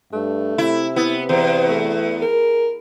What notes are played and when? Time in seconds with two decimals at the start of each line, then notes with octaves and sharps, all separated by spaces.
0.13 G2 A3
0.58 C3 E4
0.96 B3 E4
1.29 E2 C5
1.69 A3
2.22 G#4 A#4